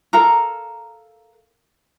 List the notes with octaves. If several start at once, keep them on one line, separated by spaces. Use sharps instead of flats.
A4 A#4 F5 A#5